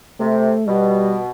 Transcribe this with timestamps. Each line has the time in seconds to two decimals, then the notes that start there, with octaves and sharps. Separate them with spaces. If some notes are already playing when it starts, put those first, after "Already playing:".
0.19 C3 A3
0.68 B2 G3